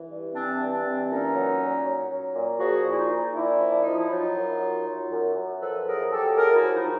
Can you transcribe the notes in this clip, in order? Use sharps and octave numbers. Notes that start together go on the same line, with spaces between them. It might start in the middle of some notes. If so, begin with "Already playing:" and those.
Already playing: E3
G2
E3 C4 D4
G2
C4 D4
E3
A#2 C#4 D#4
F#3
A#2
F#3
F#3
A#2
F3 F#4 G#4
A#2 E4
D#4 F4
A#2
A#2 D4 E4
F3
D4
F3 D#4
E4
F#3 D#4 F4
F#2
F#3
F#3
F#2
F#2
F3 A4 B4
F#2 G#4 A#4
F#2 G4 A4
F#2 G#4 A#4
E4 F#4
F3
D#4 F4